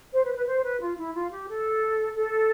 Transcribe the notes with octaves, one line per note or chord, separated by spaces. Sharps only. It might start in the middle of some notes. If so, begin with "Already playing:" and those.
C5
B4
C5
B4
C5
B4
F4
E4
F4
G4
A4
A4